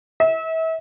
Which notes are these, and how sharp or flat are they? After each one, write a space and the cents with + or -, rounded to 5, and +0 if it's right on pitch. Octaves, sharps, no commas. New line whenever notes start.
E5 -35